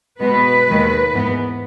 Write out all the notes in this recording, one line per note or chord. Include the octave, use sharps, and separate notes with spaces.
B2 G#3 B3 B4
D#2 D#3 G#3
G#2 E3 B3